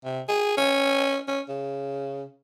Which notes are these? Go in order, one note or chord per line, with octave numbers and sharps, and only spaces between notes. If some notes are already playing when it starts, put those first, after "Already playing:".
C3
G#4
C#4
C#4
C#3